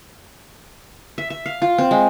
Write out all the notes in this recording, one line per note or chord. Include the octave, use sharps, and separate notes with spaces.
E5
E5
F5
F4
C4
G#3